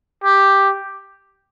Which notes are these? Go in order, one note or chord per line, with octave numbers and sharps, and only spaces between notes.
G4